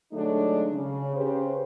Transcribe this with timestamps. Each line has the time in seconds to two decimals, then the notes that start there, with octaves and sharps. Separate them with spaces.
0.12 D3 F#3 G#3 A3 D4 D#4
0.73 C#3
1.16 C#3 C#4 G4 B4 C5